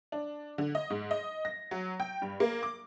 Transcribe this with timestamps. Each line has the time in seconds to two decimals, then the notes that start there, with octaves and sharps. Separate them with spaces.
0.12 D4
0.58 D3
0.75 D#5
0.90 G#2
1.11 D#5
1.45 A#6
1.71 F#3
2.00 G5
2.22 G2
2.40 A#3
2.63 D6